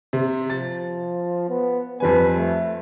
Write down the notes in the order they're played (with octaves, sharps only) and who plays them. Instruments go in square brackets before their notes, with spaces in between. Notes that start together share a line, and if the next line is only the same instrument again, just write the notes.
[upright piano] C3
[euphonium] F3 [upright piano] A6
[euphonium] B3
[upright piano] F2 G3 G#5 [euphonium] B4
[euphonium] A3